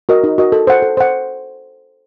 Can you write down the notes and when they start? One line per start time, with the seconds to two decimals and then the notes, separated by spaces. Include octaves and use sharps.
0.09 F#4 A#4 D#5
0.24 D#4
0.38 F#4 A#4 D#5
0.52 A4
0.67 C5 F#5
0.82 A4
0.97 C5 F#5